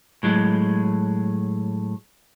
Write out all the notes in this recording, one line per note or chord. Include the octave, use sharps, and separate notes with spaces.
A2 F#3 G#3